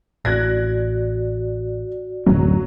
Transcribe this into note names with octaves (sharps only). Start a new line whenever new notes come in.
A1 F#4 D5 F#6 G#6 A#6
D1 F#2 F#3